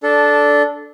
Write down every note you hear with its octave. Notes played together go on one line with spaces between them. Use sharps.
D4 A4